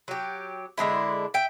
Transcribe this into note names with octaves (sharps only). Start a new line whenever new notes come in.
F#3 G4
D3 G#3 D4 E4
E5 G5